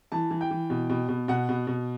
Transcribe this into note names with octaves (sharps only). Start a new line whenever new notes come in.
E3 A5
E3
G5
E3
B2
B2
B2
B2 F#5
B2
B2